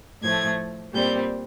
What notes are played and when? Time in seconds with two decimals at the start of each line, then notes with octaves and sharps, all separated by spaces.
0.23 A2 F3 A3 G#6
0.94 A#2 G3 C4 G6